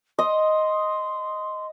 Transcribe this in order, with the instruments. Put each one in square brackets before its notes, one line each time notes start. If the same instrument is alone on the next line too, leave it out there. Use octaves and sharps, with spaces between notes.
[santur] D#5 [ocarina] C6